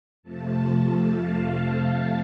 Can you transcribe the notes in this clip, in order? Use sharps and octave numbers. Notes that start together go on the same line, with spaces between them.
F2 C3 F3 A3 A5
F5